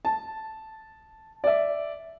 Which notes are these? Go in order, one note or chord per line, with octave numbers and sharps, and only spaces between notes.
A5
D5 E5